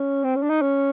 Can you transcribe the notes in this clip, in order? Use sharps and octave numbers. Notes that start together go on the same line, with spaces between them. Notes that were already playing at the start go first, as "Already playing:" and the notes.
Already playing: C#4
C4
C#4
D4
D#4
C#4